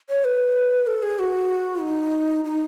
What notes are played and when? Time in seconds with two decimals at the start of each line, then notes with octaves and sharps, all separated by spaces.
0.10 C#5
0.25 B4
0.87 A4
1.03 G#4
1.19 F#4
1.81 D#4
2.45 D#4